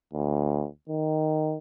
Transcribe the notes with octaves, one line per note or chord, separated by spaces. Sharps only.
D2
D#3